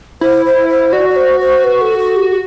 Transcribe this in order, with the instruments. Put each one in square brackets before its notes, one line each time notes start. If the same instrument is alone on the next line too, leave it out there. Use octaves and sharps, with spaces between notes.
[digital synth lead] E4 [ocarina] C5
[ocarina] C5
C5
[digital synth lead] F#4 [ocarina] D5
[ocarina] D5
C5
C5
B4
A4
A4
G4
G4